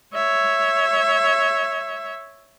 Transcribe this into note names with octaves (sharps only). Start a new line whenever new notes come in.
C#5 E5